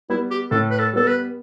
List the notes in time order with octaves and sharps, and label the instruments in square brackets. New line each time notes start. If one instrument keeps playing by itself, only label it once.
[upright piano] G3 B3 [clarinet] E4
[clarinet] G4
[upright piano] A2 [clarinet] A4
[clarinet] B4
A4
[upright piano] G3 B3 [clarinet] A4
[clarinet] B4